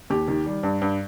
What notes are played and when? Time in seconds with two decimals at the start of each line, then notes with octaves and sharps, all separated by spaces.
0.10 D#2 G4
0.28 D#3
0.46 G3
0.63 G2
0.82 G2